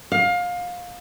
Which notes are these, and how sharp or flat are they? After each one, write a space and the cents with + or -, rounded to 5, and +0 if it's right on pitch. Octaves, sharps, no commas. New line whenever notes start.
F5 +25